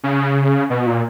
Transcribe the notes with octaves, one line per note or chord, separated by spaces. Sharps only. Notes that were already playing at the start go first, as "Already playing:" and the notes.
C#3
B2
A#2